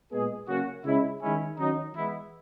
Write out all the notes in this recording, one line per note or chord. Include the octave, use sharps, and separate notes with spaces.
A#2 G#3 B3 G#4
C#3 F#3 A#3 C#4 F#4
C#3 G#3 C#4 E4
D#3 G#3 C#4 E4
D#3 F#3 C#4 D#4
E3 G#3 B3 E4